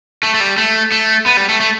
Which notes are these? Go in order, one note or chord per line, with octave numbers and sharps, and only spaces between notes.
A3
A3
G3
A3
A3
B3
G3
A3
A3